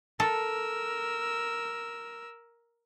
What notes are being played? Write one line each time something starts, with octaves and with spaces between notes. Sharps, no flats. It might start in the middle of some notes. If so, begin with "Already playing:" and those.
A4 A#4 E6